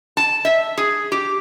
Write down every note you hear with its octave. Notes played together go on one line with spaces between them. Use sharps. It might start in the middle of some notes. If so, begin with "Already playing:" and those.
A5
E5
G#4
G4